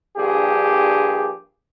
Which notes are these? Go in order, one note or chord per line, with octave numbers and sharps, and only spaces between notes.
A#1 G2 G4 G#4